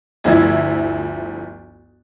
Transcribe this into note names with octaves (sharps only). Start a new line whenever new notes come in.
G1 D2 F3 E4 E5 G#6